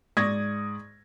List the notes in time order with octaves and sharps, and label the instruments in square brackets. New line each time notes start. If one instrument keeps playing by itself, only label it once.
[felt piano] G#2 D5 C#6 D#6 G#6 A#6